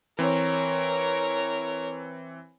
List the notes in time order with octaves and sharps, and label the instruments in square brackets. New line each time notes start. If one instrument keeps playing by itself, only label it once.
[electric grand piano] E3 C4 [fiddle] A#4 C#5